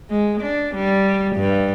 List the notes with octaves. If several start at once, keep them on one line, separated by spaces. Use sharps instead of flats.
G#3
D4
G3
G2